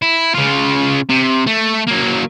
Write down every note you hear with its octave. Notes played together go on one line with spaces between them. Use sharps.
E4
C#3 F4
C3
A3
F#3 A#3